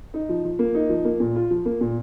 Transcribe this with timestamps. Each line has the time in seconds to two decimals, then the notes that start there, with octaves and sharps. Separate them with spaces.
0.14 D#4
0.29 F3
0.44 F3
0.59 A#3
0.75 D#4
0.89 F3
1.05 A#3
1.20 A#2
1.36 F4
1.51 F3
1.65 A#3
1.81 A#2